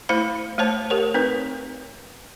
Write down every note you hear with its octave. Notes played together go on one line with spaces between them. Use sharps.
A3 E4 C5 F5 B5
A3 C5 C#5 A5
G4 A#4 C#5
C4 D#4 B4